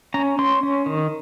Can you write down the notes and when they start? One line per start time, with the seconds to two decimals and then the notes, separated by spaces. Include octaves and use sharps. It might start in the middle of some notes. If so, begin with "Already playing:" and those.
0.14 C#4 A#5
0.39 C#4 C6
0.63 C#4
0.86 D#3